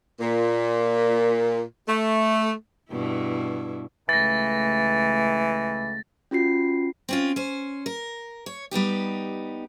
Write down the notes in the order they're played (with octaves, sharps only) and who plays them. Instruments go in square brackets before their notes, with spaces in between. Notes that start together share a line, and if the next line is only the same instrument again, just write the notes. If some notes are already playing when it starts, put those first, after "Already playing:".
[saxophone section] A#2
A3
[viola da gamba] G2 B2 E4
[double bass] C#2 A3 [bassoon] E3 [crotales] A6 A#6
[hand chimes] C#4 F4 F#4 C7
[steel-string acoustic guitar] C4 C#4 F4
C#4 C5
A#4
C#5
G3 B3 D#4 G4